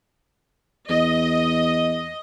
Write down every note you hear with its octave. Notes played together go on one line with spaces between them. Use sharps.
E2 D#5